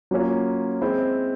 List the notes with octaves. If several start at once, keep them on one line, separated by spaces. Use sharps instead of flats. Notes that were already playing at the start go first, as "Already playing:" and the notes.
F#3 A#3 C#4 F4
G#3 C4 E4